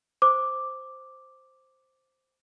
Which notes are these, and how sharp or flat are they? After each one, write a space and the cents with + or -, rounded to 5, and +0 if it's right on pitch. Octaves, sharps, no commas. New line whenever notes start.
C5 +0 D6 +0